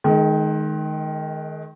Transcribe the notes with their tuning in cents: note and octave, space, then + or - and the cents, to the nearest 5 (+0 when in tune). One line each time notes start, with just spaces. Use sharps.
D#3 +0 G#3 +35